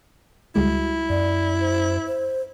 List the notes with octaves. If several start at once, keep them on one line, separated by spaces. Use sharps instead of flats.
C#2 G3 G#3 E4 F#4
F#2 D5
C5
C5